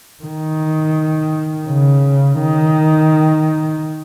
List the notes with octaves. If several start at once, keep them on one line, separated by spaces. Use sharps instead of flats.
D#3
C#3
D#3